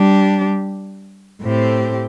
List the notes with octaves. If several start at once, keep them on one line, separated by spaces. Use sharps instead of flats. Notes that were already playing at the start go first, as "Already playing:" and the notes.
Already playing: G3 D4 G4
A2 A3 C4 G4